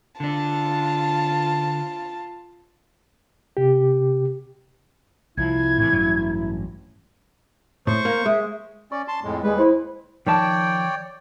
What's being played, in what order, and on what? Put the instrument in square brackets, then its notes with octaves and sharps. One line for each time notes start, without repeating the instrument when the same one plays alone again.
[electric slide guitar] D3 D4 [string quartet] F4 A5
[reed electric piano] C3 G4
[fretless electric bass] C2 F3 [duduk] E4 [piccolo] G#6
[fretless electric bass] A2 C3 E3
A1 G2 F#3
[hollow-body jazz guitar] A2 [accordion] C5 C#6
[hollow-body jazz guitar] A#3
[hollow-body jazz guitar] G#3 [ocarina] E5
[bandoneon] C#4 D5 [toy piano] C#6
[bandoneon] A5 C6
F2 A2 G#3
[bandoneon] D#2 G3 B4 [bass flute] G#3
[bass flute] E4 [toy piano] C5 C6
[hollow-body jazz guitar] D#3 F3 A5 [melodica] C#5 D5 G5